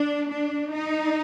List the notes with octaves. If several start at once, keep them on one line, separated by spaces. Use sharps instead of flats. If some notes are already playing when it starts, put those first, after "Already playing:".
Already playing: D4
D4
D#4